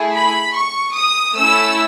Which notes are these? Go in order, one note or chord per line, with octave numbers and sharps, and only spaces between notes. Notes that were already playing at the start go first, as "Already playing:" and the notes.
Already playing: A3 E4 G#4
B5
C#6
D#6
A3 C#4 E4 E6